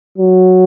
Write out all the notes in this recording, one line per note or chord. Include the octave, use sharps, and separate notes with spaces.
F#3